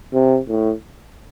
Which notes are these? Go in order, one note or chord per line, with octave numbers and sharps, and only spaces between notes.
C3
A2